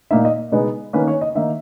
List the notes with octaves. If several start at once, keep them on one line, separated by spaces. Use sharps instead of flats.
A#2 A#3 D#4 E5
D#5
B2 G#3 B3 D#4
D#3 A#3 C#4 B4
C#5
D#5
D#3 A#3 D#4 E5